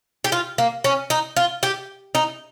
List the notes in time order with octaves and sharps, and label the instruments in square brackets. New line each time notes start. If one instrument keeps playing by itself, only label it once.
[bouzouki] G4
F4
A#3
C#4
D#4
F4
G4
D#4